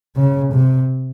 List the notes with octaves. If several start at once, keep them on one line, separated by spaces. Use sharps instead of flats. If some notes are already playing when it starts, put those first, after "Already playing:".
C#3
C3